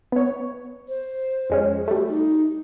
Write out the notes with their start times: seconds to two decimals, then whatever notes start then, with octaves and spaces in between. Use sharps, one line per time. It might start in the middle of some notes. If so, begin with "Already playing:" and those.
0.12 B3 C#5
0.88 C5
1.50 F2 G#3 C#4
1.88 G3 A3 F#4
2.09 D#4